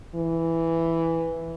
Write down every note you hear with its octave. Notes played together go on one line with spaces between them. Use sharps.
E3